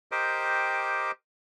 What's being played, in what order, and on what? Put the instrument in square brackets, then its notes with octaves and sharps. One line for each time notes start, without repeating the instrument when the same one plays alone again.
[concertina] G4 A#4 C5 D#5 G5 D6